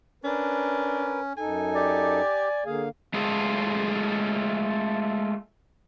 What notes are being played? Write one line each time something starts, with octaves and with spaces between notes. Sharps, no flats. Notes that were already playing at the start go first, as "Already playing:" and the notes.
C#4 D4 A#4 B4
F#2 D#4 A4 G#5
G4 D5
D3 A#3 G#4 F5
G#3 A3 F4 G#4 A4